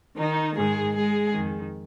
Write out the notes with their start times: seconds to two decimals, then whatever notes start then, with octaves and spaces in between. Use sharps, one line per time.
0.16 D#3 D#4
0.55 G#2 D#3 G#3 G#4
0.94 G#3 G#4
1.33 F2 D#3